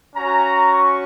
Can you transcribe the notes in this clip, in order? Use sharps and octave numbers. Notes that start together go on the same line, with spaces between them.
C#4 F#4 A#5
C#6